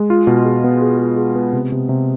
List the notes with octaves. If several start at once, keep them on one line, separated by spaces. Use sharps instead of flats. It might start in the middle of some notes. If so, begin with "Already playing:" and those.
Already playing: G#3
F4
B2
G#4
B3
G#4
G#4
G#4
B3
C3
C3
C3